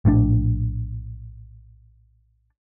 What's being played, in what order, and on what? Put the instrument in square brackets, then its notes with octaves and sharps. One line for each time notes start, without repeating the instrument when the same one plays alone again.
[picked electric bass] A#1 A2 C#4 D4